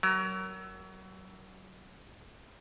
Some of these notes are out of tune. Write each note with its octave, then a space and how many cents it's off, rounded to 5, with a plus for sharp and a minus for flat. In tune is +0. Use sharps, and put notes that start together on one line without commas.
F#3 +25 A#4 +0